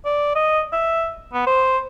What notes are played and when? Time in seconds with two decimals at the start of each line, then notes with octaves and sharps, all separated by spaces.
0.05 D5
0.35 D#5
0.73 E5
1.34 B3
1.47 C5